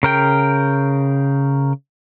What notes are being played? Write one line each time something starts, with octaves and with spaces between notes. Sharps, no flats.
C#3 A#4 G5